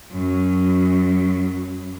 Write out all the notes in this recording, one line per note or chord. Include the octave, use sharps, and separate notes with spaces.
F#2 F#3